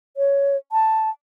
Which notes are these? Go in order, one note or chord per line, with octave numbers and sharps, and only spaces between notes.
C#5
A5